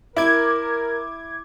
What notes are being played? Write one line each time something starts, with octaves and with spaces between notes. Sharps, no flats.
E4 A#4 D6 G#6